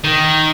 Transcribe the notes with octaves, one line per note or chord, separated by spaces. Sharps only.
D#3